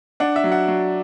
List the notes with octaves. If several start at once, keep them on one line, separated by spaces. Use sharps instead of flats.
D4 F#5
E5
F#3
F#5
F#3